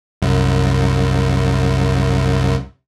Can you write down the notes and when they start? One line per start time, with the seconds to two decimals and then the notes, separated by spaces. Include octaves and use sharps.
0.22 C2 F#2